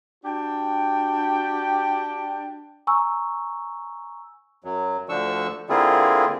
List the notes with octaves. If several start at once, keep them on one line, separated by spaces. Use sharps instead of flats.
D4 F#4 G4 G5
G#5 A#5 C#6 E6
F#2 F#3
D2 D3 F3 D4 C#6 E6
D3 A#3 C4 E4 F4 G#4